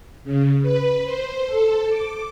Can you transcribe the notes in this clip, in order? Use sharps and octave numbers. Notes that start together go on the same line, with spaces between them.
C#3
B4
C5
A4
D6